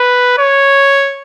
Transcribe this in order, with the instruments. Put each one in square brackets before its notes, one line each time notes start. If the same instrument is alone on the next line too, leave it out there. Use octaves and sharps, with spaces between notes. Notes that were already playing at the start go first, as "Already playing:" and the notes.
Already playing: [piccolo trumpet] B4
C#5